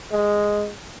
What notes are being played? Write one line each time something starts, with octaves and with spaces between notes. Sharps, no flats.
G#3